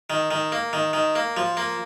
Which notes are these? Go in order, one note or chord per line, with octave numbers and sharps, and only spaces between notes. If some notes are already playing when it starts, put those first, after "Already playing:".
D#3
D#3
A#3
D#3
D#3
A#3
F3
A#3